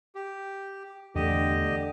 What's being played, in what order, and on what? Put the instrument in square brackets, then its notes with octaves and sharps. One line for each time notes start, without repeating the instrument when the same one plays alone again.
[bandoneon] G4
[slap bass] E2 A3 [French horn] D3 [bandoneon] G4 D#5